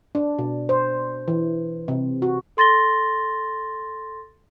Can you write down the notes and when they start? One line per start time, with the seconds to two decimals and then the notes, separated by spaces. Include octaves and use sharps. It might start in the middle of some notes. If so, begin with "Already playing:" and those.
0.15 D4
0.39 B2
0.69 C5
1.28 E3
1.88 C3
2.22 F#4
2.57 A4 C6 A6 A#6 G7